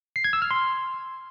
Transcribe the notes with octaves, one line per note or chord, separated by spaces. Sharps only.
C7
G#6
E6
F6
C6